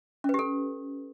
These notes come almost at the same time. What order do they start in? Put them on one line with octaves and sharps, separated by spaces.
C#4 B4 G4 A4